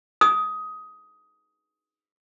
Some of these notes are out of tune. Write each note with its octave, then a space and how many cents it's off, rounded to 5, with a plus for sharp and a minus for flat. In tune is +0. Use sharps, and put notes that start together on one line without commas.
D#6 +15